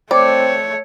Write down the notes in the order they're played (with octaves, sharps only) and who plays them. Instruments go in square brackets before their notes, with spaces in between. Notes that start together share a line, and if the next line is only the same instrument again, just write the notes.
[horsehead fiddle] A3 C#5 [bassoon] C4 [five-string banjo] D5